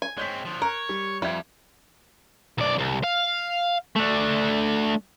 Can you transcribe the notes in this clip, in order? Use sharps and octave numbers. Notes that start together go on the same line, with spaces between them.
G#5
G#3 C4 C#5 G6 B6
D3 F3
A#4 C#5 F#6
G3
F2 F3 G3 E5 G#6
B1 D5
C2
F5
A3 D4